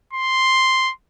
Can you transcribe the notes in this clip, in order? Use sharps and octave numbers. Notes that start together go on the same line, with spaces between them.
C6